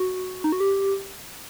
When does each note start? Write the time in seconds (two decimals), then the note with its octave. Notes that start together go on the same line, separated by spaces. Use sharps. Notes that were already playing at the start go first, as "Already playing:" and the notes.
Already playing: F#4
0.44 D#4
0.52 F#4
0.60 G4